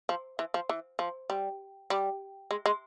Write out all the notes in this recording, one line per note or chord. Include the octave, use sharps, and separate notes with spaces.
F3
E3
F3
E3
F3
G3
G3
G#3
G#3